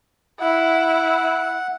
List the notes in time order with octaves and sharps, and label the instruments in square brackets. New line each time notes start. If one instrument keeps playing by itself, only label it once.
[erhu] E4 [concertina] F#5